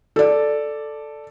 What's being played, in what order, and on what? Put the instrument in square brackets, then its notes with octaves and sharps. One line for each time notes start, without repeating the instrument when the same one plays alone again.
[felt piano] A4 D5